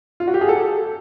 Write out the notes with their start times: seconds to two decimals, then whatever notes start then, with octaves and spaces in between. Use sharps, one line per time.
0.20 F4
0.28 F#4
0.34 G4
0.41 G#4
0.49 A4